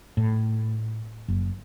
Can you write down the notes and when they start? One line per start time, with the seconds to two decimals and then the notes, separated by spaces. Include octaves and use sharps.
0.17 A2
1.28 F#1